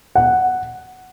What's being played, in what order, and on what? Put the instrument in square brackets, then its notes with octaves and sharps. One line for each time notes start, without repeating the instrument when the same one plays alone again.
[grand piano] F#5